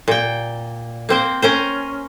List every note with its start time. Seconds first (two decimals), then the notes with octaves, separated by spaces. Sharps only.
0.08 A#2 G5
1.09 A#3 C4 C5
1.42 C#4 A#4 C5